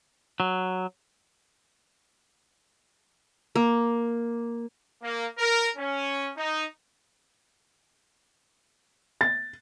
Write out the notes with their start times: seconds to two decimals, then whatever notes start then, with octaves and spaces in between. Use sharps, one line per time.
0.40 F#3
3.55 A#3
5.02 A#3
5.37 A#4
5.76 C#4
6.37 D#4
9.21 A6